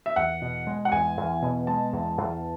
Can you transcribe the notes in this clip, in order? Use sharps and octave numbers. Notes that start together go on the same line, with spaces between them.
E5
E2 F#5
B2
G#3
F#5
E2 G#5
E2
B2
G#3 A5
E2
E2